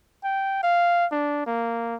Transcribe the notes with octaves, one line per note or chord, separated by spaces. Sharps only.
G5
F5
D4
A#3